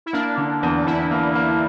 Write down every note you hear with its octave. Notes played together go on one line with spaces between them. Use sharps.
E4
A#3 D4
D3
E2
E2 E4
A#3
A#3